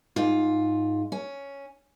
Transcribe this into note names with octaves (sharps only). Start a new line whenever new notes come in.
G#2 F4
C#4